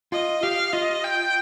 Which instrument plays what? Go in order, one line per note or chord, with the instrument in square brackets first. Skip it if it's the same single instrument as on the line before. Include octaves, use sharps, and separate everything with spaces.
[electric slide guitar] F4 [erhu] D#5
[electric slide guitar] G4 [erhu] F5
[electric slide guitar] F4 [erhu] D#5
[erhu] G5